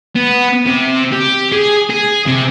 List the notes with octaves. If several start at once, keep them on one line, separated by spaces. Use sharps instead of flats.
B3
C3
G4
G#4
G#4
C3